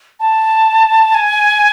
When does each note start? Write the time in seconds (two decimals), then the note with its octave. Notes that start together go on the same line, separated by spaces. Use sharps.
0.20 A5
1.14 G#5